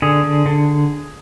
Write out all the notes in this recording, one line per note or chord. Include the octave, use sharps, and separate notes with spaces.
D3 G#4
D3
D3